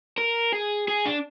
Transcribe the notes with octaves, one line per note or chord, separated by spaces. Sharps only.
A#4
G#4
G#4
D4